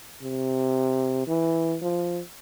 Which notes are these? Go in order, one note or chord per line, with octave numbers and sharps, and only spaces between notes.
C3
E3
F3